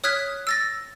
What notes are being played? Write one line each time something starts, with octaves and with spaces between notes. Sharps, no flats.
C#5 D#6 F6 F#6 G#6 B6
E6 A6 A#6